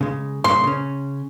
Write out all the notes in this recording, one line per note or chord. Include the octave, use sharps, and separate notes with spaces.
C#3 G#3
G2 A#2 C#3 C6
C#3 C#4